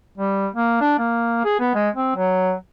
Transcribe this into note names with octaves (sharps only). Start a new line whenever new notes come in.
G3
A#3
D4
A#3
G#4
B3
G#3
C4
F#3